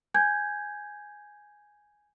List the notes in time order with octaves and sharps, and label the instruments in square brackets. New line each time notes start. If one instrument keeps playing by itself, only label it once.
[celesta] G#5 G6 G#6